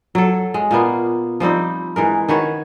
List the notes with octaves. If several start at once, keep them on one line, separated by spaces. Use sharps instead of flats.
F#3 A4
G#3
A#2 A#3 B3 F4
F3 G3 C4 D#4
E3 G#3 A#4
D#3 F#4 B4 C#5